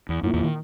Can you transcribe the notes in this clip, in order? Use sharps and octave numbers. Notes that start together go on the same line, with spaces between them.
E2
F#2 A#2 A#3 E4
E2 E3
D#3